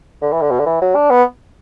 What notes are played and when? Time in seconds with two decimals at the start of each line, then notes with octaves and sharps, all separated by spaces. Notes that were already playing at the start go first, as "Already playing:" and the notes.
0.22 D3
0.32 E3
0.42 D3
0.51 B2
0.59 D3
0.66 E3
0.82 F#3
0.95 D4
1.10 B3